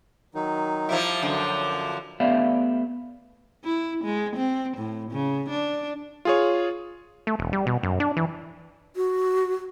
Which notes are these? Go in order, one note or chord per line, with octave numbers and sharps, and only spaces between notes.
D#3 F#3 D#4
F3 G3 E4
F#2 D3 F3 F#3
D6
A3 B3 G4 D5 E5 F5
E4
G#3
C4
A2
C#3
D4
F4 G#4 C#5
A3
E1
G3
B2
F#2
D4
E3
F#4